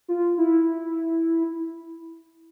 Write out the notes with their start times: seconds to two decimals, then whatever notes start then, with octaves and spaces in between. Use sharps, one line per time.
0.08 F4
0.38 E4